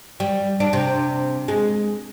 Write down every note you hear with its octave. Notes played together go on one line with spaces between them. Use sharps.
G3
D4
C3
G#3